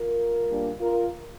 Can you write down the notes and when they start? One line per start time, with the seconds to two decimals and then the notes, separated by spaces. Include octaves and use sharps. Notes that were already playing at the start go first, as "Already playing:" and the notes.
Already playing: F4 A#4
0.48 A#2 G3 A#3 D4
0.80 F4 A#4